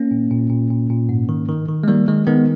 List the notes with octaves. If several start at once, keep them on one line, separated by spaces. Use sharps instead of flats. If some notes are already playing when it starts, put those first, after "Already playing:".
Already playing: A#3 C#4
A#2
A#2
A#2
A#2
A#2
G#2
D#3
D#3
D#3
G#3
D#3 G3 A#3
D#3 G#3
D#3 G#3 B3